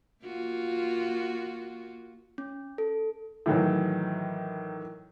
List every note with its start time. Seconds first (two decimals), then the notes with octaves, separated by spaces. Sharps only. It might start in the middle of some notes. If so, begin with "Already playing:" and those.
0.24 A#3 F4 F#4
2.38 C#4
2.78 A4
3.46 A2 D#3 E3 F#3